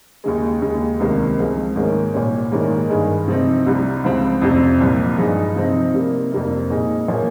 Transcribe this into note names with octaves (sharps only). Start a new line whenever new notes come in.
D#2 C#3 G#3
D#2 C#3 G#3
C#2 C3 D#3 G3 A#3
C#2 C#3 F3 G#3 C4
G#2 D#3 A#3 C#4
C2 A#2 G3 C#4
G#2 D#3 G3 A#3 C#4
G2 D#3 G#3
C3 F3 C4 D#4
C2 C3 G3
C#2 C#3 F3 C4
F2 C3 G3 C4
C2 A#2 F3
G2 F3 G#3 D#4
C3 F3 C4 D#4
C3 G3 A#3
F2 C3 G3 A#3
A#2 G#3 D#4
A#2 F3 A#3 C#4